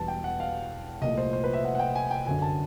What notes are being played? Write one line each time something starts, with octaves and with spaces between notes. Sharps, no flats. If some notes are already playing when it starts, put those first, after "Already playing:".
Already playing: E1 E2 B2 G3 B3 A5
G5
F#5
F5
C2 A#2 F3 A3 D#5
C5
C5
B4
E5
F#5
F#5
G5
G#5
G5
G1 F#2 D3 G#5
A5